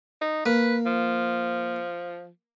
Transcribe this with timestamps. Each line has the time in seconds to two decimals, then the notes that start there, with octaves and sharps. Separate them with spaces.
0.21 D#4
0.46 A#3 B4
0.86 F3